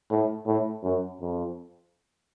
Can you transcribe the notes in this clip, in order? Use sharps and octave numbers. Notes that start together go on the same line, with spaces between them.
A2
A2
F#2
F2